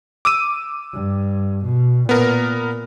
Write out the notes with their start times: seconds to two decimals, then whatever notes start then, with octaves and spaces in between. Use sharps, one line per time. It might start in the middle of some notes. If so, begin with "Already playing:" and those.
0.25 D6 E6 D#7
0.93 G2
1.66 B2
2.09 A#2 B3 A#4